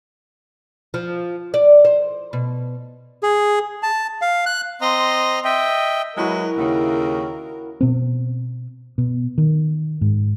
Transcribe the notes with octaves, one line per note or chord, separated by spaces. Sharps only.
F3
D5
C5
B2
G#4
A5
F5
F#6
C4 D#5 A#5 C6
D#5 E5 G5
F#3 G#3 E4 F#4 A#4 B4 F#5
D#2 C#3
B2 C4
B2
D#3
G#2